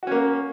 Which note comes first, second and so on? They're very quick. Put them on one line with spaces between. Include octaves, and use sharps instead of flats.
F#4 C#4 A#3